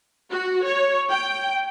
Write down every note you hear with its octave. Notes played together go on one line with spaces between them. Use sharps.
F#4
C#5
G5